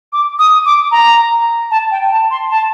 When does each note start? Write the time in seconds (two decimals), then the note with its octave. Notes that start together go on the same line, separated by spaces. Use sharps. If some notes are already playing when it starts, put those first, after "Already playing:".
0.13 D6
0.39 D#6
0.66 D6
0.91 A#5
1.71 A5
1.91 G5
2.11 A5
2.31 C6
2.51 A5